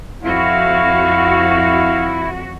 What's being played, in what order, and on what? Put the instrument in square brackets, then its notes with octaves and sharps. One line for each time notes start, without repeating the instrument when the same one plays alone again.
[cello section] F2 F#4 [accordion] E4 [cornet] F5